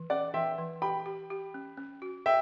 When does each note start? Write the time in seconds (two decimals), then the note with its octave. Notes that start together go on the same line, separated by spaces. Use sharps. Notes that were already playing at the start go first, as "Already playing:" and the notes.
Already playing: E3
0.10 C#4 D5 F#5
0.34 E3 E5 G5
0.58 E3
0.82 G4 G5 B5
1.06 G4
1.30 G4
1.54 C#4
1.77 C#4
2.02 F#4
2.26 E5 G5